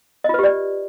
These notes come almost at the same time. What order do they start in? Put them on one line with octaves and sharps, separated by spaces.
D#5 F4 B4 G4 D5